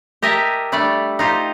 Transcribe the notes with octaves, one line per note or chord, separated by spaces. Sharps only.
G4 A#4 D#5 E5 G#5 A5
G3 A3 D4 D5
D#4 F4 G4 C5